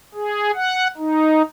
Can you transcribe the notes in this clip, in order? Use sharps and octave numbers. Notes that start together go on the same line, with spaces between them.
G#4
F#5
D#4